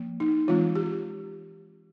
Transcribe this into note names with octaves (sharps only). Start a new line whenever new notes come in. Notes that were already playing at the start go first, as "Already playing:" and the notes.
Already playing: F3 A#3
D#4
E3 G#3 C4 F4
G4